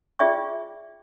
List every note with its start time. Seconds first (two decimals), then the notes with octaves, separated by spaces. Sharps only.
0.19 F4 G#4 D5 E5 G5 C#6